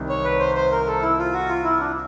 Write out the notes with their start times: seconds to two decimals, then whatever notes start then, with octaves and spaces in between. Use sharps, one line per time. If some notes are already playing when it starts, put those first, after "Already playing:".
Already playing: C2 C3 D#3 G3
0.09 C#5
0.25 B4
0.40 C5
0.55 C5
0.72 A#4
0.87 A4
1.02 E4
1.18 F4
1.34 F#4
1.49 F4
1.64 E4
1.80 D4